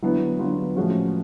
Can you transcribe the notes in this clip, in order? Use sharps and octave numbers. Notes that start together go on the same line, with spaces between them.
D3 F#3 B3 E4
D3 F#3 B3 F4
A2 F3 G#3 C#4 F#4